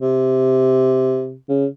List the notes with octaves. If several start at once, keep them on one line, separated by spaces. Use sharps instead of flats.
C3
C#3